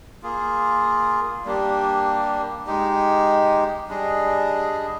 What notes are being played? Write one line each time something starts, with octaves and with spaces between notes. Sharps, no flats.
A#3 F4 G#4
G3 A#3 D4 G4
G#3 D#4 G4
G3 D4 G#4 D#5